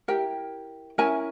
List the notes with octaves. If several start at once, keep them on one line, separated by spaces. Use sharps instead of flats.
E4 G4 A#4 G5
C#4 E4 A#4 G#5